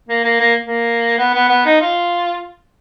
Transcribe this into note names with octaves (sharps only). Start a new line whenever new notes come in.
A#3
A#3
A#3
A#3
B3
B3
B3
D#4
F4